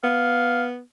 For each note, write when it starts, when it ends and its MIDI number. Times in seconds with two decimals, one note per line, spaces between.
0.03 0.80 59
0.03 0.64 77